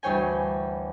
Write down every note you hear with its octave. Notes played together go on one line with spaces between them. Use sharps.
D2 G2 E3 C#5 G5 G#5